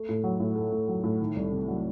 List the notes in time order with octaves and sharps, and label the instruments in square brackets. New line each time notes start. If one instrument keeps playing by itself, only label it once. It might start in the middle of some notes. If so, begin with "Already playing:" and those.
Already playing: [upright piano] A3
A2
F#3
A2
A3
A2
F#3
A2
D#3
C2
C3
F#3